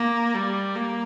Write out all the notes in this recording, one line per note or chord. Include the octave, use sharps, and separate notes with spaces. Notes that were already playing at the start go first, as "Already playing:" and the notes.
Already playing: A#3
G3
A#3